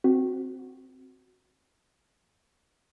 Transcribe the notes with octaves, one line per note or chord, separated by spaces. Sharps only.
C4 F#4